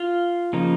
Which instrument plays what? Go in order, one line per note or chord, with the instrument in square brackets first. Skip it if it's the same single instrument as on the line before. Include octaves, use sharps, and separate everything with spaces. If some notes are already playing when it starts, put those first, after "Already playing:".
Already playing: [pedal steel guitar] F4 F5
C#3 F3 A#3 D#4